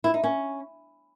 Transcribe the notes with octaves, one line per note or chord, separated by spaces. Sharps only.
E4
D#4
C#4